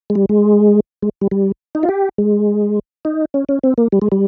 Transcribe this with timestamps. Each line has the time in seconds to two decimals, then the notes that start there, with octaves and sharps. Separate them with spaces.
0.10 G#3
0.15 G3
0.29 G#3
1.02 G#3
1.21 G3
1.31 G3
1.75 D#4
1.83 F4
1.89 G4
2.18 G#3
3.05 D#4
3.34 C#4
3.49 C#4
3.63 C4
3.78 A#3
3.92 G3
4.02 G#3
4.12 G3